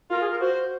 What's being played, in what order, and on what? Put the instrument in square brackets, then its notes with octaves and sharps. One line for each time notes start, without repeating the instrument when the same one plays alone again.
[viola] F4 [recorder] A#4
[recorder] G#4
A#4
[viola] F#4 [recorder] C5